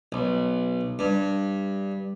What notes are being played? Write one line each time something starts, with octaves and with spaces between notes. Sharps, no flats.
B1
G2